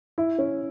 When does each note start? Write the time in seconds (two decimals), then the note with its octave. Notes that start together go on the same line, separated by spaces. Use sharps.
0.18 E4
0.39 C#4